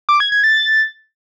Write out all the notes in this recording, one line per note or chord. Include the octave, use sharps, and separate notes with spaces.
D6
G#6
G#6
A6